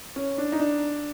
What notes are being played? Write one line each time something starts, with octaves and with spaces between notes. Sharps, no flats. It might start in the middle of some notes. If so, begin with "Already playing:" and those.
C#4
D4
D#4
D4